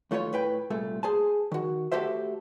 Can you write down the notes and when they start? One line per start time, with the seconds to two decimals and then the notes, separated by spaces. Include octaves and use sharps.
0.11 D#2 A3 F4 B4 C#5
0.33 A2 B4 G5
0.70 C2 A#2 A3
1.03 G#4 C5 G#5 A5
1.52 D#3 F#4
1.92 A3 F#4 G4 A4 C5 E5